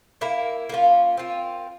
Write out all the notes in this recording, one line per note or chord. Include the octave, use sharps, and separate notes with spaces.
A#3 E4 A#4
A#3 C#4 F4
C4 F4 A#4